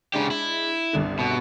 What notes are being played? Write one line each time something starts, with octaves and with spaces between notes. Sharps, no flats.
C#3 G#3 D4 G4
E4
G1 C2 D3
B2